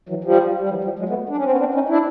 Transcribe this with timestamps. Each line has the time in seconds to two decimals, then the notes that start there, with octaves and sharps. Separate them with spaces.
0.09 E3 F#3
0.24 F3 G3
0.59 G3
0.69 E3 F#3
0.84 F3 G3
0.99 F#3 G#3
1.09 A3 B3
1.29 D4
1.37 C#4
1.44 C4
1.52 B3 C#4
1.59 C4 D4
1.74 C#4 D#4
1.89 D4 E4